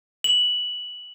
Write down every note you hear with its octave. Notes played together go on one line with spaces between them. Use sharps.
F#7